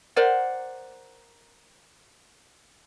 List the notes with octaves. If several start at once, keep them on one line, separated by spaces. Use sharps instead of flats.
A#4 C5 D5 F#5